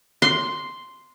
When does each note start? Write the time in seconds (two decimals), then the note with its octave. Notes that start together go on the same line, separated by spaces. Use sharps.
0.22 C6